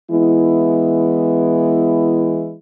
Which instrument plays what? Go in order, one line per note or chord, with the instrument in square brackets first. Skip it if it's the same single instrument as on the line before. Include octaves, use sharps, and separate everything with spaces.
[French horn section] E3 G#3 B3 E4